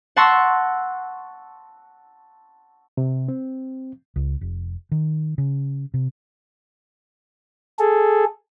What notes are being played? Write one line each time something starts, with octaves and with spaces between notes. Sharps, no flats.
F#5 A5 C6 C#6 E6 A#6
C3
C4
C#2
F1
D#3
C#3
C3
G#4 A4